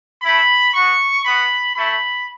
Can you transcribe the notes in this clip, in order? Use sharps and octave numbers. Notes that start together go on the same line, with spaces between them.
A3 E4 B5
B3 F#4 C#6
B3 F#4 B5
A3 E4 B5